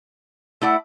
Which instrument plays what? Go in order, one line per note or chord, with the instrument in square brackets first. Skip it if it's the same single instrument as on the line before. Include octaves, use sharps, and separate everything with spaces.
[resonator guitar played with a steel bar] A3 E4 D5 [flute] F#5